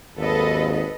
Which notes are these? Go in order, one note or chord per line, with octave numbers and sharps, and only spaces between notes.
G#1 D#2 A4 B4 D#5